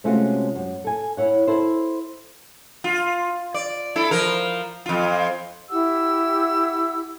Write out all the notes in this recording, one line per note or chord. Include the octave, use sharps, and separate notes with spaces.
C3 G#3 A3 C#4 F4 F#4
F#2
A4 G#5
E4 C#5 F#5
E4 A4 C5
F4
D5
E4 A4
F3 A#4
F2 F4
E4 G4 F#5 E6